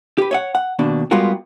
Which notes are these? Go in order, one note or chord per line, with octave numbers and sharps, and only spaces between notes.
G4 B4
C#5 D#5 F#5
F#5
D#2 B2 D4
G3 G#3 B3 F4 F#4 A#4